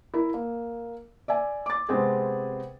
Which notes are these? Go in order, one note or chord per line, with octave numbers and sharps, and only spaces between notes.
E4 A#4
A#3
D5 E5 G#5
D6 A6
C3 G#3 B3 C4 G#4